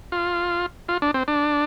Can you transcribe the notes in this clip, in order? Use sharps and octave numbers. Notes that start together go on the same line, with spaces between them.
F4
F4
D4
C4
D4